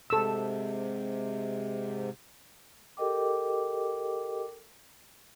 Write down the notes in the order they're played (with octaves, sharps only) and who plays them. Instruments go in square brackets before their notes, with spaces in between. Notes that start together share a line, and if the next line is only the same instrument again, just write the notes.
[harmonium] G#2 C3 [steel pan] A4 E6
[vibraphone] G4 A4 A#4 D#5 G5 D6